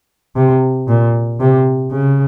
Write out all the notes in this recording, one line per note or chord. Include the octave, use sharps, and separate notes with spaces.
C3
A#2
C3
C#3